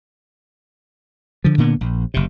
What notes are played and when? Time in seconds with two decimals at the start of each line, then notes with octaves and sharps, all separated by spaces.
1.44 D3 F3
1.58 A#2 D3 A#3 B3
1.81 A#1
2.14 F#1 C3